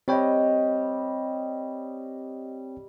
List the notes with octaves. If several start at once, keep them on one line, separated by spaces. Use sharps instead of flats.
G3 C4 C#5 D#5 G5